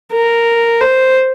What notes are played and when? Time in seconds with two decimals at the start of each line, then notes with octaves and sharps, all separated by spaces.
0.13 A#4
0.81 C5